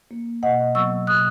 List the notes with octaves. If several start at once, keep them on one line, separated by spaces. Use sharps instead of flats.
A#3
B2 D#5 F#5
F#3 B3 C#6 E6
B2 D#6 F#6